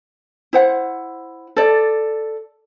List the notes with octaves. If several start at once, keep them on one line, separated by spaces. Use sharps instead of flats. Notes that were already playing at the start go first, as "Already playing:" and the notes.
E4 C5 F#5
A4 D5